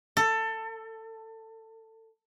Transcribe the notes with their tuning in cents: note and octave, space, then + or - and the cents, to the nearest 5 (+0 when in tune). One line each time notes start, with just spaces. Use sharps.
A4 +20